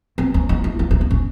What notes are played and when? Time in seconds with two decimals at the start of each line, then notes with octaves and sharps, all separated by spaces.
0.18 C4
0.34 C#4
0.49 D#4
0.64 E4
0.79 E4
0.91 E4
1.01 D#4
1.11 C#4